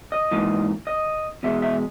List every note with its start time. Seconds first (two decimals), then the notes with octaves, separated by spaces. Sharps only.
0.12 D#5
0.31 G#2 E3 A#3
0.87 D#5
1.43 E2 B2 G#3 E5
1.62 E5